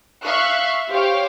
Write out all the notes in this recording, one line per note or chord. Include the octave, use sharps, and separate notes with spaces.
E5 F5 C#6 F#6
G4 C5 C#5 F5 G5